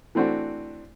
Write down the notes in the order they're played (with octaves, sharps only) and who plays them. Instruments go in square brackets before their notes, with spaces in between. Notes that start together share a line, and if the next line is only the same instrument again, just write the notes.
[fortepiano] E3 A3 C4 D4 F#4